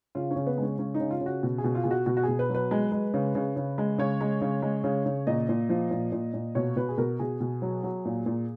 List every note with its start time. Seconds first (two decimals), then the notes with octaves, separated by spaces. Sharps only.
0.15 C#3 F4
0.31 C#4
0.36 C#3
0.47 B3
0.57 G#3 C#4
0.78 C#3 C#4
0.94 D#4
1.00 C#3
1.11 F4
1.21 C#3
1.26 F#4
1.43 B2
1.58 G#4
1.64 B2
1.75 F4
1.83 B2 G#4
1.91 F#4
2.06 B2 F#4
2.17 F#4
2.23 B2 G#4
2.39 B4
2.49 F#3
2.55 B4
2.71 G#3
2.92 G#3
3.14 C#3
3.35 C#3
3.56 C#3
3.78 G#3
3.98 C#3 C#5
4.21 G#3
4.41 C#3
4.62 G#3
4.84 C#3
5.06 C#3
5.27 A#2 D#5
5.49 A#2
5.69 F3
5.91 A#2
6.12 A#2
6.34 A#2
6.55 B2 C#5
6.76 B2 B4
6.89 G#4
6.98 B2 A#4
7.19 B2 G#4
7.40 B2
7.62 F#3
7.83 F#3
8.05 A#2
8.26 A#2